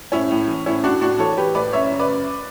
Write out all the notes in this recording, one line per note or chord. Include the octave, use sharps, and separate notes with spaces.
A2 C#4 E4
A2
E3
A2 C#4 E4
A2 D4 F#4
A2 D4 F#4
E3 A4 C#5
E3 G4 B4
A2 B4 D5
F#2 C#5 E5
C#3
B4 D5
F#2